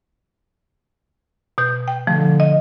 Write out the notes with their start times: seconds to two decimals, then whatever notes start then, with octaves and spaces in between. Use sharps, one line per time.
1.58 B2 G6
1.88 G5
2.07 D3 F3 A3
2.40 D#5